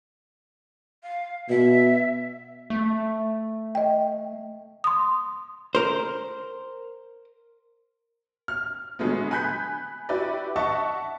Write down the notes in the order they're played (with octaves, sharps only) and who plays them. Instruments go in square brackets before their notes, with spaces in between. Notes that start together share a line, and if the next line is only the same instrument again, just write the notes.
[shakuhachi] F5
[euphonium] B2 [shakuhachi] E5
[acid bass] A3
[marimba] D#5 G5
C6 D#6
[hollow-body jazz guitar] A#4 C5
[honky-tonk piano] F6
D3 F#3 G#3 A3 B3
G#5 B5 F#6 G6 B6
E4 F#4 G4 B4 D5
D#5 E5 F#5 A5 C#6